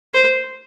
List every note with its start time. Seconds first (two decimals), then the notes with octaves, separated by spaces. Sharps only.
0.14 C5